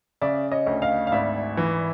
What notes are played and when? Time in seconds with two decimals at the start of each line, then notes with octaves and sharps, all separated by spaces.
0.22 C#3 D5 E5
0.52 C#5 D#5
0.66 D2
0.82 D#5 F5
1.07 F5
1.12 G#1 D5 E5
1.57 E3